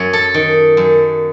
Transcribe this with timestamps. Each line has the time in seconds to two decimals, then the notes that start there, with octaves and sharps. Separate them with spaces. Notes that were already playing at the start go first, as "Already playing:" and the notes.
Already playing: F#2 C#5
0.13 A4
0.34 D#3
0.77 F#2